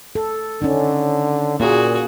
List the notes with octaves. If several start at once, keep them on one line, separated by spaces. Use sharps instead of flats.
A4
D3 C#4 D#4
A#2 A#3 F#4 G#4